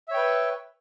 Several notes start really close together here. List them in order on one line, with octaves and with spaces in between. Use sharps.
E5 C#5 G5 B4